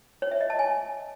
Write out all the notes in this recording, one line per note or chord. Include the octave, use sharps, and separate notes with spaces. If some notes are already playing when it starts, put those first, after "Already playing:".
C#5
E5
D#5
A5
G#5